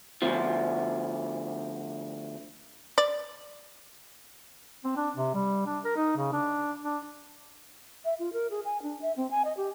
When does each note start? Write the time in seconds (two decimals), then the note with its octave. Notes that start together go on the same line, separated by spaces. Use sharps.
0.22 D2 F3
2.98 D5
4.84 C4
4.96 D4
5.16 C3
5.34 G3
5.66 D4
5.84 A#4
5.96 D#4
6.16 C#3
6.32 D4
6.83 D4
8.05 E5
8.19 F4
8.33 A#4
8.51 G#4
8.65 G#5
8.83 D4
9.02 E5
9.17 C4
9.31 G#5
9.45 D#5
9.57 G4